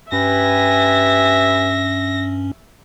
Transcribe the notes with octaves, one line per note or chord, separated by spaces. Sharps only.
G2 C#4 G4 B4 E5 G#5 A#6